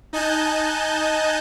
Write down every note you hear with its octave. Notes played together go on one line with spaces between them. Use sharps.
D#4 D#5 G#5 A5 F#6 G6